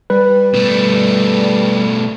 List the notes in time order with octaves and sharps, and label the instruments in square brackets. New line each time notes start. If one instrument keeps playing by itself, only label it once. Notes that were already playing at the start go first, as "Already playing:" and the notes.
[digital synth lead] G3 [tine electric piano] B4
[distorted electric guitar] B2 A3